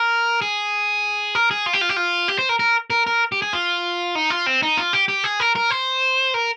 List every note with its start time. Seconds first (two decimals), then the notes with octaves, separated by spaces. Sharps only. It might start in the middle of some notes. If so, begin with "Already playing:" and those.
Already playing: A#4
0.42 G#4
1.35 A#4
1.51 G#4
1.66 F4
1.73 G4
1.81 F4
1.89 G4
1.96 F4
2.28 G4
2.39 C5
2.49 A#4
2.59 A#4
2.90 A#4
3.07 A#4
3.32 G4
3.42 G#4
3.53 F4
4.15 D#4
4.30 F4
4.46 C4
4.62 D#4
4.77 F4
4.93 G4
5.08 G4
5.24 G#4
5.40 A#4
5.56 A#4
5.70 C5
6.34 A#4